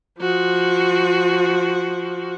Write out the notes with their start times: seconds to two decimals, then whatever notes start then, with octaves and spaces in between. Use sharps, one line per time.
0.19 F3 F#4